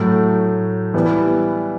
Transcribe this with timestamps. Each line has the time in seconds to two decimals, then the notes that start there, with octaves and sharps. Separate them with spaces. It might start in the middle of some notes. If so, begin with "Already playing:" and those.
Already playing: A2 F#3 A3
0.94 E3 G3 B3